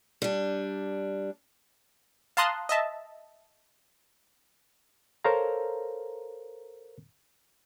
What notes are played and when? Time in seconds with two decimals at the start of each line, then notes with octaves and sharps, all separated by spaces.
0.22 G3 D4
2.37 F5 A5 A#5 C6 D#6 F#6
2.69 D#5 E5 A5
5.25 A4 A#4 C5 C#5 F5 A#5